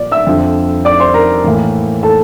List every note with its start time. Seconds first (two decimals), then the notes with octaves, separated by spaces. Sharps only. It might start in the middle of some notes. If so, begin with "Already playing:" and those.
Already playing: A#2 F3 D5
0.12 E5 E6
0.27 F2 D3 F3
0.85 D5 D6
1.00 C5 C6
1.14 A#4 A#5
1.44 A2 E3 A#3
2.03 A4 A5